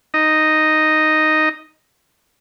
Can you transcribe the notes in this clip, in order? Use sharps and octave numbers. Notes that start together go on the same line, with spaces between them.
D#4 D#5